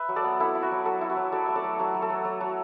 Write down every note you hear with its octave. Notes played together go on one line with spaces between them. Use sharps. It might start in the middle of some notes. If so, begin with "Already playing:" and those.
Already playing: B4 E5
F#3
A4 D5
B3
E4 A4
E4
F#4
F#3
F#3 A4
E4
F#4 B4
F#3
F#3 A4 D5
A3 E5
A4 D5
F#3
F#3 F#4
F#3
A4
F#3
F#3
F#3